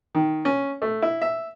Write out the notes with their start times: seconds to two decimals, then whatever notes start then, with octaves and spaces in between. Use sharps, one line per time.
0.15 D#3
0.45 C#4
0.82 A3
1.02 E4
1.22 E5